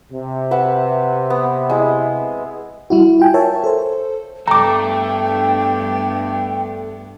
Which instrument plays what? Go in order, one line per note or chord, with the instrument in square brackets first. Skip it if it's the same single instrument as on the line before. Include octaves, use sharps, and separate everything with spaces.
[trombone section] C3
[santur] B4 E5 F#5
B3
G#3 E4
[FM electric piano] G3 E4 F#4
F4 G5 G#5
A#4 C#5 E5 A5
A4 C5
[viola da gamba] G2 B3 D4 [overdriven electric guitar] A3 A4 [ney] G5 [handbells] A#5 D6